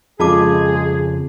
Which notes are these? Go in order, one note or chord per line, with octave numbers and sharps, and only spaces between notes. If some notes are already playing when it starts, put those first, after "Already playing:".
F2 C#3 G#3 F4 G#4 A5 D6